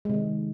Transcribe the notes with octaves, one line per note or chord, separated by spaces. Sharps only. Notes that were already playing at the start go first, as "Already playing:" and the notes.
C3 D#3 G#3